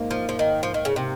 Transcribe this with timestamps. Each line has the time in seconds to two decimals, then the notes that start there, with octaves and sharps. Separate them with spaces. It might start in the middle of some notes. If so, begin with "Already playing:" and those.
Already playing: G#2 A#3
0.11 F3
0.29 F3
0.39 D#3
0.63 F3
0.74 D#3
0.85 C#3
0.96 C3